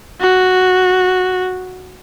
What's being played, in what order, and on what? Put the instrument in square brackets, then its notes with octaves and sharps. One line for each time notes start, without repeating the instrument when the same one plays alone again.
[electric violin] F#4